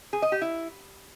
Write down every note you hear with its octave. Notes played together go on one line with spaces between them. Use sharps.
G#4
D#5
G4
E4